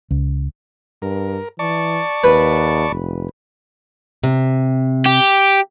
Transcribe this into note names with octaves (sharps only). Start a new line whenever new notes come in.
C#2
G2 A#4
E3 D5 A5 C#6
D#2 B4
F1
C3
G4